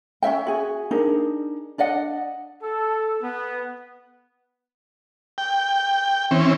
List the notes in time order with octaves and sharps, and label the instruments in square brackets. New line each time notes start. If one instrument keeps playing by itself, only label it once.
[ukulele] C#4 D#4 E5 G5
F#4 G#4
D4 D#4 G#4 A#4
D4 D5 D#5 F#5
[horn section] A4
B3
[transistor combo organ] G5
E3 C4 C#4